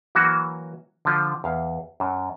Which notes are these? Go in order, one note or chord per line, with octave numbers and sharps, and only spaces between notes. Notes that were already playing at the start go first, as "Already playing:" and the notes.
E3 F#3 A#3 F#4
D3 F3
E2 F5
F#2